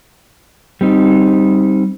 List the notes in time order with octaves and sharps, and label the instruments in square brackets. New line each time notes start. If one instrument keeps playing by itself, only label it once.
[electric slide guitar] G3 C4 D#4